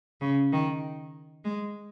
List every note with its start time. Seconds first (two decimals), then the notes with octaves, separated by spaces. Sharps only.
0.21 C#3
0.53 D#3
1.45 G#3